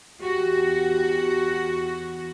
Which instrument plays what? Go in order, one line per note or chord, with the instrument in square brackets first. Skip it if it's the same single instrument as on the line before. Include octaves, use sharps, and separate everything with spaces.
[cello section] E2 F#4 [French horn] G4